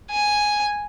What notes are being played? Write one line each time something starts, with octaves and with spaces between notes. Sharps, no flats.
G#5